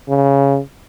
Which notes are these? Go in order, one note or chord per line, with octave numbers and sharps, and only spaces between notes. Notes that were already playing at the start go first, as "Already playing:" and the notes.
C#3